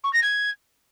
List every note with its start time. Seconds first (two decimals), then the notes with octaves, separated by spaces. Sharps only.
0.03 C#6
0.13 A#6
0.22 G#6